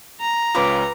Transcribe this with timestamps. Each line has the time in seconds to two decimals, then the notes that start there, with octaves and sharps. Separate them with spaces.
0.20 A#5
0.55 C#2 C#4 F4 B4 D6